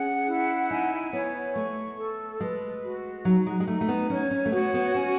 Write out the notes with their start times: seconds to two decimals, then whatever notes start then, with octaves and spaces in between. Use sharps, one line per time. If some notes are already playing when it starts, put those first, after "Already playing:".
Already playing: C#4 G#4 F#5
0.28 E4
0.70 D#4 G#5
1.13 B3 C#5
1.55 A3 C#6
1.98 A4
2.40 G#3 B4
2.83 F#4
3.24 F#3 D#4
3.47 G#3
3.60 G#3
3.67 A3 D#4
3.81 A3
3.88 B3
4.10 C#4 C#5
4.31 C#4
4.46 A3
4.52 B3 F#4
4.74 B3
4.95 C#4 G#5